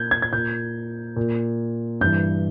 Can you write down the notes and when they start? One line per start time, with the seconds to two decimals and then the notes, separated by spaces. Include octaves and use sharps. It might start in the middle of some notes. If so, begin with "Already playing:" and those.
Already playing: A#2 G6 G#6
0.11 G#6
0.22 G#6
0.33 A#2 G6
1.16 A#2
2.01 G2 E3 G6